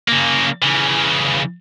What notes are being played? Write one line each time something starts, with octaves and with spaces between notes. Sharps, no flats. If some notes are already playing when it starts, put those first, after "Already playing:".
C#3 A#3
C#3 E3